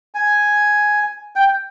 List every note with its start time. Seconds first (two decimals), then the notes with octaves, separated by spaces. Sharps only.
0.14 G#5
1.36 G5